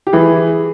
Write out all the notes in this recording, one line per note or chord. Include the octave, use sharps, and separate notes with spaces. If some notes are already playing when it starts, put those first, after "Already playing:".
G4
E3 G#4